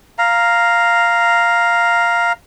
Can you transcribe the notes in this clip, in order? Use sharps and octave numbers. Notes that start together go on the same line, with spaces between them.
F5 A#5